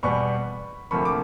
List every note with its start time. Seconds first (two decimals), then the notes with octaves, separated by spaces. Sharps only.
0.03 E2 B2 G3 B3 B5 C#6
0.91 D2 C3 F3 A#3 B5 C#6
1.05 D6